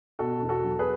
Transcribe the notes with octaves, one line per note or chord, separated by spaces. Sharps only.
B2 F#4 A4
E2
F#4 A4
F#3
G#4 B4